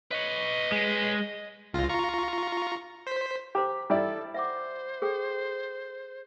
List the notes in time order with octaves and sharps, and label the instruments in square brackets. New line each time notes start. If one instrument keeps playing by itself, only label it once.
[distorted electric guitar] B4 C#5 [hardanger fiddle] D#5
[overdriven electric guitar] G#3
[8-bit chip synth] C#2 F4 A#6
F4 A#5 C#6
C5 B6
[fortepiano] G4 [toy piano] C5 A#5 D6
[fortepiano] G3 E4 D5 [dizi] A4
[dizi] C5 [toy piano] E5 F#5 D6
[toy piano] G#4 A4 G5